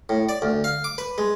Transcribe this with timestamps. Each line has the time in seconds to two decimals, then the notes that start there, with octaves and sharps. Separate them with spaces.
0.09 A2
0.29 D5
0.42 D2
0.64 F5
0.84 D6
0.98 B4
1.18 G#3